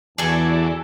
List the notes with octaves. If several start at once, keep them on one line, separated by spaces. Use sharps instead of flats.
E2 E3 F#4 G#4 A4 D5 A5